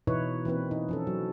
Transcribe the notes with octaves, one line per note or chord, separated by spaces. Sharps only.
B2 E3 D#4 E4 B4 C#5
E3 A#3 C4 B4
D#4
F3 C#4 A4
F#3